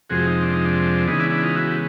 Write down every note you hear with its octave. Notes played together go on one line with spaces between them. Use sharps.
F2 C3 F3 G#3 F#4 G#4
D#4
D4
D#4
D4
C#3 E3 G#3 B3 D#4
D4 E4
D4 E4
D#4 F4
E4 F#4
G4